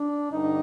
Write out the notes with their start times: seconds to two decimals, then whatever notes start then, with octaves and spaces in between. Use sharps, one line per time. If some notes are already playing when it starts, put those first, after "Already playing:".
Already playing: D4
0.31 G2 D3 D#4